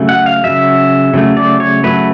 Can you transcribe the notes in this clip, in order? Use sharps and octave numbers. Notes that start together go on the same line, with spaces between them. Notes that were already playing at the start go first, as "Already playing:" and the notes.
Already playing: C#3 F#3 A3
F#5
F5
C#3 F#3 A3 E5
C#3 F#3 A3
D5
C#5
C#3 F#3 A3 B4